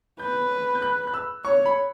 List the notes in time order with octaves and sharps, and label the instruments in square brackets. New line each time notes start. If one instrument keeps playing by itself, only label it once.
[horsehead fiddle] B4 [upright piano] G6
[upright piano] G6
F#6
F#6
E6
[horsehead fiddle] C#5 [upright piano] C#6
[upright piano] B5